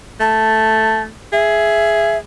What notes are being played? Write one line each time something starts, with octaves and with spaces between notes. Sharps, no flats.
A3 A5
G#4 E5